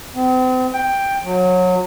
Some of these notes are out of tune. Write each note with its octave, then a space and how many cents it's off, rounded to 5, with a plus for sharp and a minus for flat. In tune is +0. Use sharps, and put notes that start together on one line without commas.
C4 -40
G5 +5
F#3 -25